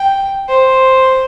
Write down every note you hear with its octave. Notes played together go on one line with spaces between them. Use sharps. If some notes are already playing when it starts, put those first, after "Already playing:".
Already playing: G5
C5